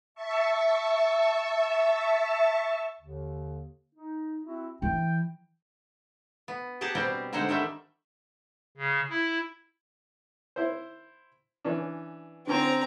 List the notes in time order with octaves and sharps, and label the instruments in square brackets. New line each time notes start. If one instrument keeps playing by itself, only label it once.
[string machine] E5 A5 C#6
[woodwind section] D#2 D3
D#4
C4 E4 F#4
[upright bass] E3 [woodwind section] G5
[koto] B3
G4 G#4 F#5 A5 A#5
B2 G3 C4 G5 A#5
D3 G#3 D#4 C5 F#5
D3 D#3 G3 E5
[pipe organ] C#3
E4
[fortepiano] E4 C5
E3 C#4 D4
[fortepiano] D3 C#4 C5 [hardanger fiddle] C4 A#5